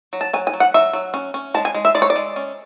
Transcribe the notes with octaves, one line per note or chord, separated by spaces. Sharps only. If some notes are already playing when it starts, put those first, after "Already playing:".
F#3
A5
F#3 G#5
G#5
F#3
F#5
F#3 E5
F#3
C#4
C#4
G#3 A5
G#5
G#3
E5
G#3 D5
C#5
D5
G#3
C#4